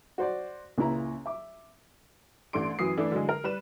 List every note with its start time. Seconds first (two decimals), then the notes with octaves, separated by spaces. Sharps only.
0.18 F#4 C5 D5
0.78 C#2 A#2 E4 A#5
1.26 E5 D6
2.53 A1 A3 D4 C6 D7
2.79 F#2 E3 F#3 D#6 C7
2.98 E3 A3 D4 E4
3.12 D3 F#3 G#3
3.29 A#4
3.44 G3 B4 E7